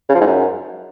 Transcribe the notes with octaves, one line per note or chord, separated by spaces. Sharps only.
C#3
F3
G#2
F#2